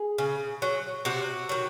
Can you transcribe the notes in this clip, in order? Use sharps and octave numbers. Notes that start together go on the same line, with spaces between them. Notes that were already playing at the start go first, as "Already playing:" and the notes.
Already playing: G#4
C#3
F#3
C3 F#4
D#3 F#3